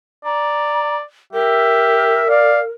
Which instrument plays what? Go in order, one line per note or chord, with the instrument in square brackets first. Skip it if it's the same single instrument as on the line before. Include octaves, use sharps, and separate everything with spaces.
[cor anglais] D5 [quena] A#5
[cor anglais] G4 [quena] A#4 [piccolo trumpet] E5
[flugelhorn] D5 [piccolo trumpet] F5